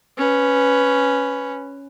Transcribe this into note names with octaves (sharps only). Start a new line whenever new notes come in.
C#4 B4